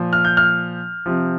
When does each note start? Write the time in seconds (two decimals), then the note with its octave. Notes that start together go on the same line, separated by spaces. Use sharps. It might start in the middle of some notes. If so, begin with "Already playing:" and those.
Already playing: A#2 F3
0.13 F6
0.25 G6
0.37 F6
1.06 C3 F3